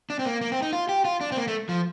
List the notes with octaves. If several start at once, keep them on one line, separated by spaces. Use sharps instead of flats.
D4
C4
A#3
A#3
C4
D#4
F4
G4
F4
D4
C4
A#3
A3
F3